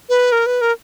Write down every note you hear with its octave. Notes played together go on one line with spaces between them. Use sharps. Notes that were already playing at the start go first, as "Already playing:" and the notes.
B4
A#4
B4
A#4